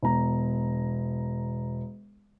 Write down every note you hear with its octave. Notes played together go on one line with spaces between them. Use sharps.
E1 A#5